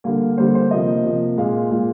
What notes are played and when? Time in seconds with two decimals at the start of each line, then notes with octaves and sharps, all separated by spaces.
0.04 D3 G3 A#3 F5
0.38 D3 G3 A#3 C5
0.55 C5
0.71 C3 F3 A#3 D#5
1.04 C3 F3 A#3
1.37 A#2 G#3 F5
1.71 A#2 G#3